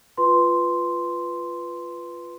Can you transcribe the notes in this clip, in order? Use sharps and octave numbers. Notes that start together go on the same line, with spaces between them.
F4 B4 C6